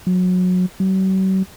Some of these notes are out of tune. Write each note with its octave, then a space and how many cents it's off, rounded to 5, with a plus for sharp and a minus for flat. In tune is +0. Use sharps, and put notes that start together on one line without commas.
F#3 -25
F#3 +45